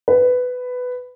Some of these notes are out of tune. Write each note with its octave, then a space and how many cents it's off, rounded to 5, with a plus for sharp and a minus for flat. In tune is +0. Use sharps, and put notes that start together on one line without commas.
B4 +10